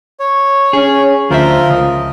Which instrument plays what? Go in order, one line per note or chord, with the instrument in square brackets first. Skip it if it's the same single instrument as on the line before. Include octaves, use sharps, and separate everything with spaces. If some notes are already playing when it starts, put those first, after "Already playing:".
[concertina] C#5
[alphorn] C#4 [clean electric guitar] G#4
[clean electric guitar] D2 C5 E5 [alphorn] F3 [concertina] F4 A#4
[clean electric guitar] C#2 [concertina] D#5